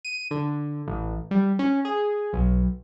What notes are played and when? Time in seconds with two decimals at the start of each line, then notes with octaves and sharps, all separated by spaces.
0.05 D#7
0.31 D3
0.88 A1
1.31 G3
1.59 C#4
1.85 G#4
2.33 B1